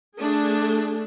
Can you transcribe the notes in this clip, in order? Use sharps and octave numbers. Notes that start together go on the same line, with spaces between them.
A3 D4 G#4